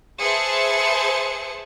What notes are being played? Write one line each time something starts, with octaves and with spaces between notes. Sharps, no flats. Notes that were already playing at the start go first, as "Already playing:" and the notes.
G#4 B4 C5 E5 A5 C#7